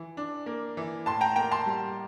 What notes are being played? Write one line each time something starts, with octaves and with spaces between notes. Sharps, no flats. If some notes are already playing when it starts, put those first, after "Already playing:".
Already playing: E3
D4
A#3
E3
A2 A5 C6
G5 A#5
A#3 G5 A#5
A5 C6
G3